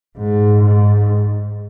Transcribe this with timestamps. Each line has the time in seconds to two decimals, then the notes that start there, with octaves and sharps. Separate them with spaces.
0.18 G#2
0.64 G#2